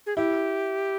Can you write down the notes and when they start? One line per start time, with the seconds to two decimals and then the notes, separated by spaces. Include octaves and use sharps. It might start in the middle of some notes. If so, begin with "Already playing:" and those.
0.06 G#4
0.16 E4 G4